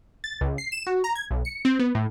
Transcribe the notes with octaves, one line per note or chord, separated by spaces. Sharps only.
A6
C#2
C7
E7
F#4
A#5
G#6
B1
C#7
C4
B3
A2